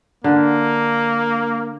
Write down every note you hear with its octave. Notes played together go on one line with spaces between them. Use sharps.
D3 A#3